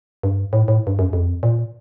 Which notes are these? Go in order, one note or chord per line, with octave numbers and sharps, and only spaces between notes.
G2
A2
A2
G2
F#2
F2
A#2